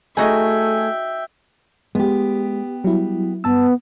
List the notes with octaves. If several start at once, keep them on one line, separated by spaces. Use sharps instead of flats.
A3 D#4 F#4 G#4 D#5 E5 G5
G#3 B3 G4
F#3 G3 E4
G2 B3 A5 E6